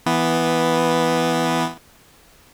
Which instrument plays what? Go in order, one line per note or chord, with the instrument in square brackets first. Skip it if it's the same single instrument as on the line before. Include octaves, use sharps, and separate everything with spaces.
[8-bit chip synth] E3 B3